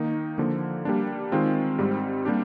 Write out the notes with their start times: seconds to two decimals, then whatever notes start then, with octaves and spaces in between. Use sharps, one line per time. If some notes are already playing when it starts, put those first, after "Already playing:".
Already playing: D#3 A#3 D#4
0.38 D3 F3 A#3
0.85 G3 A#3 D4
1.32 D#3 G#3 C4 F4
1.79 G#2 G3 C4
2.25 G3 A#3 D4 G4